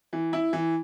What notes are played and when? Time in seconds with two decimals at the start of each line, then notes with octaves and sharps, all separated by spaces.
0.13 E3
0.33 E4
0.53 E3